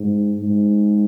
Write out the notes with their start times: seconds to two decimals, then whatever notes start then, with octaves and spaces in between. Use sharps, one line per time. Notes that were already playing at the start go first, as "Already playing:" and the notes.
Already playing: G#2
0.39 G#2